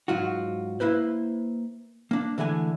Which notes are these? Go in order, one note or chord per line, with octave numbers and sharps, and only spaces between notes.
G#2 F#3 F4 F#4
A#3 E4 B4 C5
A#3 D4
D3 E3 G#3 A3 G#5